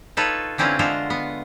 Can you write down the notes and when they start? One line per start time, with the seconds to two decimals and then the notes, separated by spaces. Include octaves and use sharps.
0.17 D#4 F4 A4 B4 C#5
0.58 D3 C4 C#4 E4 F4 B4
0.79 D3 G#3 B3 F4 F#4 E5
1.10 B3